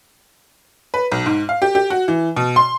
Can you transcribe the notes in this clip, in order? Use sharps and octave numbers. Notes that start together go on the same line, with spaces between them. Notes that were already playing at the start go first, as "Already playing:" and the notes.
B4
B1
G#2
F5
G4
G4
F#4
E3
B2
C6